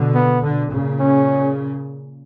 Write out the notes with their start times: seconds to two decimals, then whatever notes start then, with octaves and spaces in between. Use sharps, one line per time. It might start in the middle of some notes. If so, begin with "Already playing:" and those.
Already playing: B2 D3
0.14 B3
0.43 B2 D3
0.71 A#2 C#3
1.00 C#4